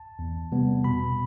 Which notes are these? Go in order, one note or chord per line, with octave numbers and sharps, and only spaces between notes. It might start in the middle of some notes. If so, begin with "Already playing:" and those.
Already playing: A5
E2
C3 G3 B3
B2 B5